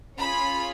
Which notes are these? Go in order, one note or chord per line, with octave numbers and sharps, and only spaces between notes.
C#4 F4 G#4 B5